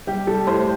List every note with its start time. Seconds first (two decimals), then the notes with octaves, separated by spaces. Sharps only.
0.07 G3 G4
0.27 G3 A4
0.47 A2 C5